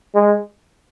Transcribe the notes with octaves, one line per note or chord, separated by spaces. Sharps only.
G#3